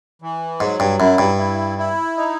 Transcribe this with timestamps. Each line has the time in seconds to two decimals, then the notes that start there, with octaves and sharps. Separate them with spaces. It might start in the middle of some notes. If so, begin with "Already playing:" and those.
0.22 E3
0.60 G#2 F#3
0.80 G2
0.99 F#2 E4
1.18 G2
1.38 E4
1.78 E4
2.17 D#4